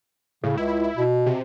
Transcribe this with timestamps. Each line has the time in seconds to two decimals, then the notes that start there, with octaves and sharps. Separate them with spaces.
0.44 A2 C#3
0.58 C#2 E4
0.96 B2
1.26 C3